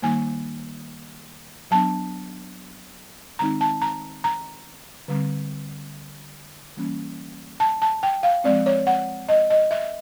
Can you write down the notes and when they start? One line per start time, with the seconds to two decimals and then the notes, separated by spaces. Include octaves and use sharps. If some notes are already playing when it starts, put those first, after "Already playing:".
0.02 D#3 G3 A#3 D#4 G#5
1.71 F#3 B3 D4 A5
3.39 D#3 G#3 C4 D#4 A#5
3.61 A5
3.82 A#5
4.24 A#5
5.08 D3 G3 C4
6.77 E3 G3 A#3 C#4
7.60 A5
7.82 A5
8.03 G5
8.23 F5
8.44 F3 G#3 C4 D5
8.66 C#5
8.87 F#5
9.29 D#5
9.50 D#5
9.71 E5